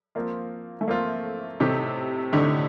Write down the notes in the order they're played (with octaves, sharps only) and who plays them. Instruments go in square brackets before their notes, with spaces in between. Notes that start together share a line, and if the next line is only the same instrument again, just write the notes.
[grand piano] F3 C4 F4 [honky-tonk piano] A#3
[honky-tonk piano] A3
[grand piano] F3 C4 F4 [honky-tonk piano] A#3
[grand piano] A2 A3 D#4 G4 [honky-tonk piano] C3
[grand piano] A2 A3 D#4 G4 [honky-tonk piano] D3